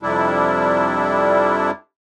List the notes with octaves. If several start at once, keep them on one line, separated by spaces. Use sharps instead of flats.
F2 C3 G3 D4 E4